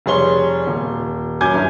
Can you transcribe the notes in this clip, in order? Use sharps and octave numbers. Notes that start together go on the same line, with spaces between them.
F1 G3 G#4 C#5 C6 G7
D#1
F#2 G#5 D6 G6 G#6
G2 E4 G#5